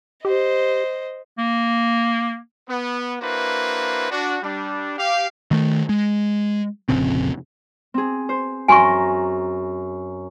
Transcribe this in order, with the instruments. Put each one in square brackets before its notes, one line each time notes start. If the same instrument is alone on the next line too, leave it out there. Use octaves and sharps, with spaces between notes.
[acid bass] G4 [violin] C5 D#5
[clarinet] A#3
[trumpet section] B3
A#3 D4 E4 F#4 B4 C5
D4 F#4
G3 D4
G4 F5
[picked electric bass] D#3 A3
G#3
F1 A#1 C#3 C4
[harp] C4 G#4
C5
[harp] F#2 A#5 [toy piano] G#5 C6 C#6